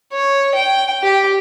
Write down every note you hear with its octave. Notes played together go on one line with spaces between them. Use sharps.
C#5
G5
G4